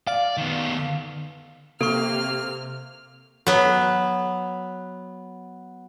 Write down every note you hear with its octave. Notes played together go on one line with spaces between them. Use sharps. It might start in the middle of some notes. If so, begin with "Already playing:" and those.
D5 F5
D#3 B3
C3 A#3 A4 C#6 F6
F#3 B3